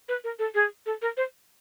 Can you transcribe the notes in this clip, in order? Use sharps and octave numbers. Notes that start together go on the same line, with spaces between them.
B4
A#4
A4
G#4
A4
A#4
C5